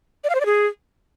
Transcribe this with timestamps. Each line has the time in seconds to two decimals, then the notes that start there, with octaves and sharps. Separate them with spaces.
0.24 D5
0.30 F5
0.35 C5
0.40 D5
0.46 G#4